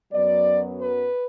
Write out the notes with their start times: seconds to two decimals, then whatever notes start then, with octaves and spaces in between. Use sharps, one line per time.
0.12 F#2 F#3 B3 D5
0.81 B4